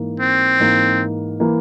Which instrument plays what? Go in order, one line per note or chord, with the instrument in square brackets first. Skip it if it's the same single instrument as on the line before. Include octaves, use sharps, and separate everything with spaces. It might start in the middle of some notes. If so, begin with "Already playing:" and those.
Already playing: [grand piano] G#2 E3 A#3
[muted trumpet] C4
[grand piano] G#2 E3 A#3
E3 A#3